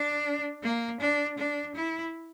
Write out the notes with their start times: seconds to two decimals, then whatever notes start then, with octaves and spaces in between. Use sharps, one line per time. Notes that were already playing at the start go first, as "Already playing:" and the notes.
Already playing: D4
0.63 A#3
1.00 D4
1.38 D4
1.75 E4